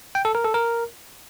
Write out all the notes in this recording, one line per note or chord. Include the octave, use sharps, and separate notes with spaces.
G5
A4
A#4
A4
A#4